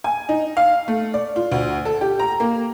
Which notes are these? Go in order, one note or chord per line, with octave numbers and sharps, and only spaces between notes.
G#5
D#4
F5
A3
D5
F4
D2
A4
G4
A#5
A#3